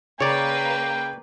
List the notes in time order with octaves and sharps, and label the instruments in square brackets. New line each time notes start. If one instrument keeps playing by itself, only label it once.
[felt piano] C#3 [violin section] A#3 B4 [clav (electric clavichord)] C#5 D5 [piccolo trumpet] G5